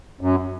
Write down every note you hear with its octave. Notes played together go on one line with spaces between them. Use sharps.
F#2